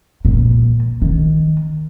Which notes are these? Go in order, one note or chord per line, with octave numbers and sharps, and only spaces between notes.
A#2
D#3